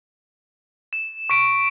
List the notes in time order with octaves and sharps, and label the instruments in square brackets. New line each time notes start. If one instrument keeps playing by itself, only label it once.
[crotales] E7
C#6 B6 D7